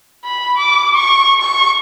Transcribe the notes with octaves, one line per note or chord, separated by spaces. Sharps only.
B5
D6
C#6
C#6